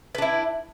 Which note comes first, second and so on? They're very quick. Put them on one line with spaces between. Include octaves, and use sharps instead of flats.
B4 D4 E4